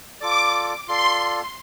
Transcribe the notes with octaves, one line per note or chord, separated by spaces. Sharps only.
F4 A4 D5 D6
F4 A4 D5 C6